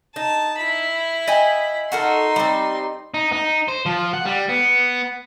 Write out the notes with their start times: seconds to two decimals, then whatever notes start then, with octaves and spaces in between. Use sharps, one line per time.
0.16 D#4 A5
0.59 E4 B5
1.28 D#5 G5 G#5
1.92 D#4 F#4 A4 A#4 C6
2.36 G3 C4
3.14 D#4
3.32 D#4
3.68 C5
3.86 F3
4.13 F#5
4.25 G3
4.49 B3